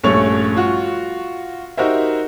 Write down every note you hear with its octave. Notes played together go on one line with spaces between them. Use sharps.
A#1 G2 A3 C#4 C#5 F7
F4 F#4 C#6
D#4 F#4 G4 A#4 C5 E5